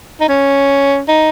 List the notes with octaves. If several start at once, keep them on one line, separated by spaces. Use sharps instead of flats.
D#4
C#4
D#4